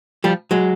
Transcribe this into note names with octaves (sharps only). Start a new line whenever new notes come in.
F3 G3
F#3 G#3